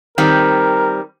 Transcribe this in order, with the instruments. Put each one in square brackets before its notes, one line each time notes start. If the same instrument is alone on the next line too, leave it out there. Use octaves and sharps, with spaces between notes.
[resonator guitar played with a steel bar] D#3 G3 C4 [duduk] A#4